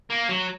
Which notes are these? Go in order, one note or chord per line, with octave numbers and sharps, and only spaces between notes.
A#3
F#3